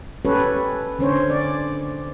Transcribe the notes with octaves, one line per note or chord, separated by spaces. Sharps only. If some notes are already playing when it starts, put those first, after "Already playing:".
C#4 G4 A4 B4 C#5
D3 C#4 C5 C#5
D5